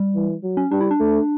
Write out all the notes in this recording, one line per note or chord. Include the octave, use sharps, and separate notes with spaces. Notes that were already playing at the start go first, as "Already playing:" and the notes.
Already playing: G3
E3
F#3
C#4
G3 D4
E4
D4
A3